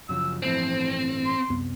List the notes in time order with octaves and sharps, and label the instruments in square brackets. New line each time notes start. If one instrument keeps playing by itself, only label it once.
[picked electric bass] F#2 C#3 F3 [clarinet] E6
[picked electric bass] G1 A2 E3 [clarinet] F3 [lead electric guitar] C4
[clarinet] C6
[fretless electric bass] C2 F#2 B3